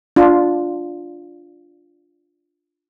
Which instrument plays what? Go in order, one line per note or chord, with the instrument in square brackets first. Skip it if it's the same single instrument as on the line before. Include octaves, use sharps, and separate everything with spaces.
[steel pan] D4 F4